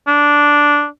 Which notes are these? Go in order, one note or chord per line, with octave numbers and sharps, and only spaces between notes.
D4